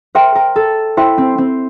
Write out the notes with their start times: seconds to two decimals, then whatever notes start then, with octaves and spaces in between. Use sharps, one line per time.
0.15 A#4 C5 E5 G5 C6
0.35 A#4
0.56 A4
0.97 E4 C5 E5 G5 C6
1.18 C4
1.38 C4